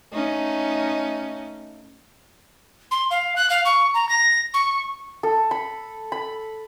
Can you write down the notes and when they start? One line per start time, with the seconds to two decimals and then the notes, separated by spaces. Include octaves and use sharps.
0.13 A3 C#4 D#4
2.91 C6
3.11 F5
3.36 F#6
3.50 F5
3.65 C#6
3.94 A#5
4.09 A#6
4.54 C#6
5.23 A4
5.51 B5
6.12 B5